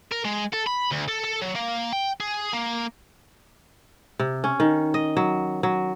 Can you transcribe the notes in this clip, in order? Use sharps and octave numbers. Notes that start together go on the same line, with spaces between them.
A#4
G#3
A4
B5
D2
A4
A4
F#3
A#3
G5
G#4
A#3
C3
C#4
D#3
D#5
F#3
F#3